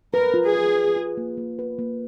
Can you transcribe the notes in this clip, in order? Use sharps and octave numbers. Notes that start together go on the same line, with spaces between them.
A#4 B4
F4
G#4
B4
B4
F4
A#3
A#3
B4
A#3